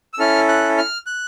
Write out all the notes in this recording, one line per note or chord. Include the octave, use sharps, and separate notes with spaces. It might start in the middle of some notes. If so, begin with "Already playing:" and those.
E6
C#4 E4 A4 F6
F#6
F6
F#6